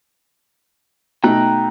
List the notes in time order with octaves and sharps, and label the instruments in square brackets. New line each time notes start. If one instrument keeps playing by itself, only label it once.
[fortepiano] B2 A3 D#4 [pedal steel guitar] G5 A#5 F#6